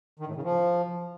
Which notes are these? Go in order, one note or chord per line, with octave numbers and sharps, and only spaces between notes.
D#3
A2
C#3
F3